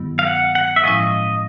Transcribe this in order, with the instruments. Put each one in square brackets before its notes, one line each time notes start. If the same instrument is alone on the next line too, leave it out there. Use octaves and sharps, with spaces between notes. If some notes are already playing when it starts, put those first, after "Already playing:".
Already playing: [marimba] G2 D#3 F#3 B3 E4
[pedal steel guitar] F5
F#5
F#5
E5
[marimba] A2 F3 G#3 C#4 E4 [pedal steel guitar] D#5